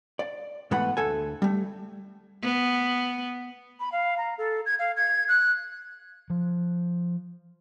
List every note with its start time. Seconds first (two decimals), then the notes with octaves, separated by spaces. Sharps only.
0.19 D5
0.71 G#2 E3 A3 B3 F#5 B5
0.97 D2 A4 G#5
1.42 G3 A3
2.43 B3
3.80 B5
3.92 F5
4.18 A#5
4.38 A4
4.66 G#6
4.79 F5
4.97 G#6
5.28 F#6
6.30 F3